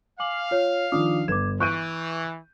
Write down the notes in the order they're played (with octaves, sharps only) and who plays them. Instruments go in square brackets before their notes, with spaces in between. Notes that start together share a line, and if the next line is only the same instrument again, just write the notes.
[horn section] F5 [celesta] G#5 D6 F#7
[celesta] F4 C#5
[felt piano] D#3 F3 D4 [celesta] F4 D6 D#6
[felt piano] G1 B4 E7 [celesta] D6 G#6
[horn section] E3 [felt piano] C#6 G6 D#7 [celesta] F#6 D7